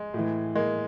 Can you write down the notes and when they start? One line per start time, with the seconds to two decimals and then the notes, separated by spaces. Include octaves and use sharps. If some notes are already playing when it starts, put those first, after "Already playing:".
Already playing: G#3
0.14 A2 E3
0.55 G#3 A#3